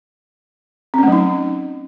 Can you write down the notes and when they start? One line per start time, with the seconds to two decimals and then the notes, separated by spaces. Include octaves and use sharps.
0.94 C4
0.98 C#4
1.03 A3
1.08 F#3
1.12 D#4